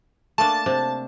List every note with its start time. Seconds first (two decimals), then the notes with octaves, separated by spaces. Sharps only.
0.38 A3 A#3 D4 A5
0.66 C3 D4